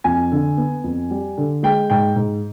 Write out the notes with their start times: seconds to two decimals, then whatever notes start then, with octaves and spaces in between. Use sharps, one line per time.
0.04 F2 G#5
0.32 D3
0.57 B3
0.84 F2
1.11 G3
1.38 D3
1.63 G#3 G5
1.90 G#2 G5
2.16 G#2